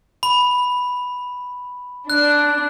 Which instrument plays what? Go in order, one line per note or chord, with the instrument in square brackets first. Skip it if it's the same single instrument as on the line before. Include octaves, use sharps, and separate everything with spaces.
[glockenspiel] B5
[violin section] D4 [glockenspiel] F#6